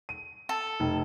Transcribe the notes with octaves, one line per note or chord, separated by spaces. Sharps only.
D#7
A4
F1